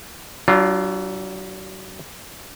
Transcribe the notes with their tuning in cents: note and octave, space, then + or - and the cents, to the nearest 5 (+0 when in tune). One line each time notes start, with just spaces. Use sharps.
F#3 +40 D4 +0 F4 +0